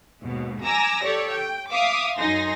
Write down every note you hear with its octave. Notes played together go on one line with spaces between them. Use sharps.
D#2 G#2 B2
G#5 A#5 D6 E6 A#6
G4 A4 C#5 D5
G5
E5 F5 D6 D#6
F#2 D#4 G#5 C6 A#6